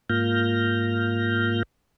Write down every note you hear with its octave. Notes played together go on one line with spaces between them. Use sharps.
G#2 A#3 F4 F6 G6 A#6